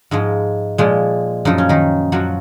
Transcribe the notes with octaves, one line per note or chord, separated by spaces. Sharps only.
G#2 F3 G#3
A#2 F3 G#3
F#2 F3 D#4
C#4
D#3 D#4
F#2 F3 F#3 F#4